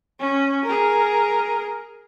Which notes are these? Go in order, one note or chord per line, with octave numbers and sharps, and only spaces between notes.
C#4
G#4 A#4